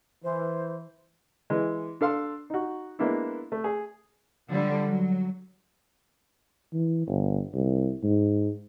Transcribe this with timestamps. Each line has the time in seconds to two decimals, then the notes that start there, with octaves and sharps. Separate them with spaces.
0.23 E3 C5
1.50 E3 G#3
2.01 D4 A4 F5 C6
2.50 D#4 F#4
2.99 G#3 A#3 B3 D4 E4
3.52 A3
3.64 G#4
4.49 D3 F3 G3
4.87 F#3
6.74 E3
7.07 G1
7.54 C2
8.03 G#2